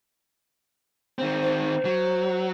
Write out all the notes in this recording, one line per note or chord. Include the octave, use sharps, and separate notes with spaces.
D#3 C4
C5
F#3